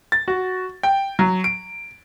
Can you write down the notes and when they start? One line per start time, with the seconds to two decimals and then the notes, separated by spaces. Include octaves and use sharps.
0.12 A6
0.28 F#4
0.83 G5
1.19 F#3
1.44 D7